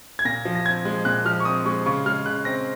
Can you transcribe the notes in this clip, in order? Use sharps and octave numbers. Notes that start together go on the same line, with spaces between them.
G#6
A#2 A#6
F3
A#6
C4 G#6
G#3
A#2 F#6
F3 F6
C#6
C4 D#6
G#3 C#6
C#3 C#6
G#3 F6
C#3 F#6
C4 A#6